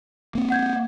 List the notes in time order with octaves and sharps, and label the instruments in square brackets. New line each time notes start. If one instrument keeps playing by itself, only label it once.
[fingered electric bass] A#3 C4
[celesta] F#5 G6 G#6